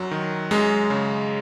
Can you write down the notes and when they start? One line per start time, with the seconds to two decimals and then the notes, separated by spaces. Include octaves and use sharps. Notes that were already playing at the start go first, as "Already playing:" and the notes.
Already playing: F#2 F#3
0.11 D#3
0.51 F#2 G#3
0.90 C#3